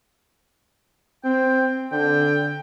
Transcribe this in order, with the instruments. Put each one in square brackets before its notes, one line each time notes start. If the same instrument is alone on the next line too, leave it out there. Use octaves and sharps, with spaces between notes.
[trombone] C4 [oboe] G5
[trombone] D3 [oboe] G5